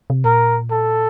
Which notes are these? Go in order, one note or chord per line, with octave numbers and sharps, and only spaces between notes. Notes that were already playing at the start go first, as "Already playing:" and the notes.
C3
A#2 A#4
A4